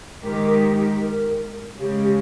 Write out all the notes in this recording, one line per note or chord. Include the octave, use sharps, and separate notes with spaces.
G#2 D#3 G#3 D#4 G4 A#4
A#4
C#3 G#3 C#4 G4